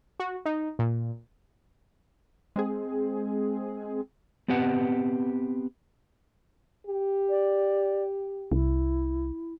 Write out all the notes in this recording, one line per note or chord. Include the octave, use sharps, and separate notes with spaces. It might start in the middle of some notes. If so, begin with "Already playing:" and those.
F#4
D#4
A#2
G#3 C4 G#4
B3 C4 G4 B4 F#5
G4
D5
C2 E4